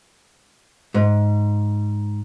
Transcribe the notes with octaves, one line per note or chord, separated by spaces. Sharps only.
G#2